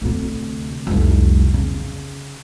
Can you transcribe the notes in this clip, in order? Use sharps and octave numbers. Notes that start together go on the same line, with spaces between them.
D2 C3
F1 C2
C#3